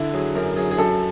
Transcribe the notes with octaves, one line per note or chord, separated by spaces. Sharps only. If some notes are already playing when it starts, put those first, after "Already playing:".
Already playing: D3 E4
F#3 G#4
F#2 A#4
F#3 G#4
G#4
F#2 A4